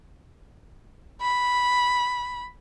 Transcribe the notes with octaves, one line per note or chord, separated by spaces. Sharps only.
B5